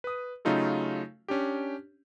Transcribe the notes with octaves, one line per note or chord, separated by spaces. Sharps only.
B4 D#6
C#3 F#3 A3 D#4 F4 A4
C#4 D4 G4